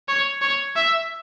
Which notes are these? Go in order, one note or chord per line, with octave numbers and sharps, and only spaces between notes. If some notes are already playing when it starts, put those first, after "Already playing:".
C#5
C#5
E5